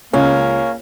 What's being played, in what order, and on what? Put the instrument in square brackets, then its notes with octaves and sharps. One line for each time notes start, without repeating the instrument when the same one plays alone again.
[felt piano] C#2 [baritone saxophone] A#3 [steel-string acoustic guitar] C#4